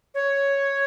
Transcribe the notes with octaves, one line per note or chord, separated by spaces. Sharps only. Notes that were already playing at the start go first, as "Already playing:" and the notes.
C#5